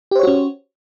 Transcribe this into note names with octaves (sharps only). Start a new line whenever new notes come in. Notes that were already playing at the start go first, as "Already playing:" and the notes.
C#4 F#4 G4 C5 C#5